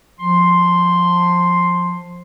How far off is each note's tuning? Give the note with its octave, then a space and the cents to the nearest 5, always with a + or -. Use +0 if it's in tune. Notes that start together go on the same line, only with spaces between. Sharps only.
F3 +20 C6 +0